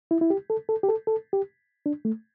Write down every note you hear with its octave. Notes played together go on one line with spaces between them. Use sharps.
E4
E4
G4
A4
A4
G4
A4
A4
G4
D4
A3